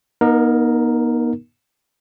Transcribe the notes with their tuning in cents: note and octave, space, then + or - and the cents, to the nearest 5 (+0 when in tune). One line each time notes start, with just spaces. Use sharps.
B3 -45 D#4 +0 A#4 +0